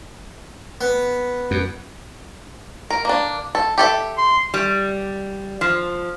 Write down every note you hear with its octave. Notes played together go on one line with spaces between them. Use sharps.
B3
F#2
A#4
A#3 D4
A4
G4 A4 E5
C6
G3
F3